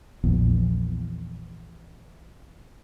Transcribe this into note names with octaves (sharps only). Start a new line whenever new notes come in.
A#1 E2